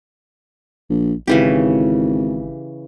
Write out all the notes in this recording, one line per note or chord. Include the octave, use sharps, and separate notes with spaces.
A#1
G#1 C#3 E3 G4